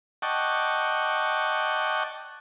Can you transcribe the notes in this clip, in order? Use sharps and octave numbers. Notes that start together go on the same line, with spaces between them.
D5 D#5 F#5 G5 A5 C#6